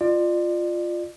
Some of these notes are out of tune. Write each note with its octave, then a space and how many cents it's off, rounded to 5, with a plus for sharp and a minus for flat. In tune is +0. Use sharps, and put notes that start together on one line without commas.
F4 +0 D5 +35